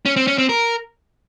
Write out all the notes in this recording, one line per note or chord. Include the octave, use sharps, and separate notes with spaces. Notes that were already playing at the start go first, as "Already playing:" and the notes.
C#4
C4
C#4
C4
A#4